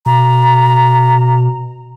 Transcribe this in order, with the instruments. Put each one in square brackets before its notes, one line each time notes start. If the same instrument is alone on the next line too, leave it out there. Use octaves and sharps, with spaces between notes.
[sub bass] B2 [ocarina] A#5